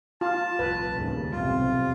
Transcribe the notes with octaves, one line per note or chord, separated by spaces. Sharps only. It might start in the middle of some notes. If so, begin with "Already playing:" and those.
F4 A5
F1 C2 A#2 B4
D#2 A2 C#3
B1 E2 C3 G3 F4